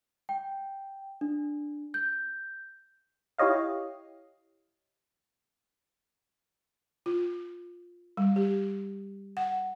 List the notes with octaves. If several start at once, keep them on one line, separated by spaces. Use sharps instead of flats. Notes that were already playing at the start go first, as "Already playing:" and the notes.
G5
D4
G6
E4 G4 C#5 D#5 F5
F4
G3
G4
F#5